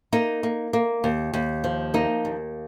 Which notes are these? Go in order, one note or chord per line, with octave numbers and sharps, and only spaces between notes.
A#3 D#4
A#3
A#3
D#2
D#2
F3
A#3 D#4
D#2